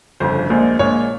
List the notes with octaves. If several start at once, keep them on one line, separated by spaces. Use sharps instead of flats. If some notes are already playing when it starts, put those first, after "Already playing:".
G1 F2 C#3 C5
A#1 A#2 G#3 C5
A#1 A#2 G#3 C#5